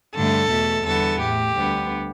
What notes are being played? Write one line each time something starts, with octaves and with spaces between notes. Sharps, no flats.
G2 D3 A3 A4
E2 B2 A3
E2 D3 G3 B3 A4
A2 A3 G4
D2 D3 G3 B3